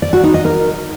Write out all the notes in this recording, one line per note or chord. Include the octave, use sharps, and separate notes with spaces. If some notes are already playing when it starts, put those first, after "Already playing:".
D5
F#4
D#4
D#5
A#4